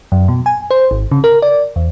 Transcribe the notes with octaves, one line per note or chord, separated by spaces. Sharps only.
F#2
B2
G#5
C5
G#1
C#3
A#4
D5
E2